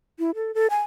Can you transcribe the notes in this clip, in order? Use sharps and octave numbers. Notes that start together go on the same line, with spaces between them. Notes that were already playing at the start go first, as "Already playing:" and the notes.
E4
A4
A4
G#5